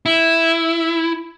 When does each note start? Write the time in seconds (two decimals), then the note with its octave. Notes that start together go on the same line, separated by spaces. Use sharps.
0.06 E4